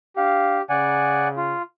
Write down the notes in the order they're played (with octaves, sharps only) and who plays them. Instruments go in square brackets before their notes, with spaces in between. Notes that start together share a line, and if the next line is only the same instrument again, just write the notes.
[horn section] D4 F5 [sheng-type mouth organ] G4
[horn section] C#3 [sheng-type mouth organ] D5 F#5 G#5
[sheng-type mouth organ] F4